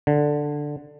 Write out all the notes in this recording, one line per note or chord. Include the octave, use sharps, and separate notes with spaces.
D3